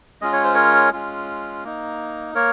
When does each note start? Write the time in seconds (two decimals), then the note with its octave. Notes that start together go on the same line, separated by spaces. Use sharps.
0.21 G#3 C#4 F4 D#5
0.33 C#5
0.44 C5
0.55 A#4 C#5
0.93 G#3 C#4 F4
1.64 A#3 D#4
2.34 A#3 A#4 C#5